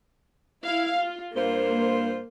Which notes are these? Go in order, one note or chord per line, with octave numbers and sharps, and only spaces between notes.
E4 F5
F4
G2 A#3 F4 C5